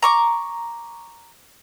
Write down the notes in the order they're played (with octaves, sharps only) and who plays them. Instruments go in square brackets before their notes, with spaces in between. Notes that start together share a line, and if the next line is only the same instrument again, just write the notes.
[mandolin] A#5 C#6 D6